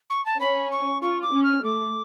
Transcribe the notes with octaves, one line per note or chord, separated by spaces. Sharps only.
C#6
A5
C#4 B5
C#6
F4 C#6
D6
C#4
F6
A3 D6